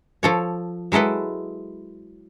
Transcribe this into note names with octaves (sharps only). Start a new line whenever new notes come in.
F3 A4 C#5
F#3 G#3 E4 A4 B4